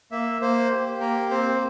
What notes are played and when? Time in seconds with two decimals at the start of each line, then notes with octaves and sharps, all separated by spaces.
0.11 A#3 E5
0.41 A#3 C5
0.71 G4
1.00 A#3 A#4
1.31 C4 C5